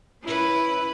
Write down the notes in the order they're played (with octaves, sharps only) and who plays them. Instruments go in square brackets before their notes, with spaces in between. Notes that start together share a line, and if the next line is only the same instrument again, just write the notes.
[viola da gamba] C#4 B4 [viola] E4